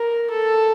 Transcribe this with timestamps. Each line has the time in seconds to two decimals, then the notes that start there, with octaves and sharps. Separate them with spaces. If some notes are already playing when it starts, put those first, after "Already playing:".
Already playing: A#4
0.30 A4